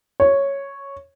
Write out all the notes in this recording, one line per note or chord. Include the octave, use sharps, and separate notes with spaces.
C#5